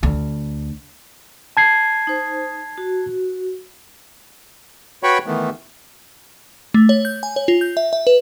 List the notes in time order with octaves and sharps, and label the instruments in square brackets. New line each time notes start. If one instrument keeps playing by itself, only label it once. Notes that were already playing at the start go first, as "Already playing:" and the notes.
[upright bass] D2
[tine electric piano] A5 G#6 C7
[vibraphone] D#4 C5
F#4
[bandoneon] F#4 B4 C#5 G5 B5 C#6
D#3 E3 A3 B3
[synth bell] A3
C#5
G6
G#5
C#5
F4
G6
E5
E5
B4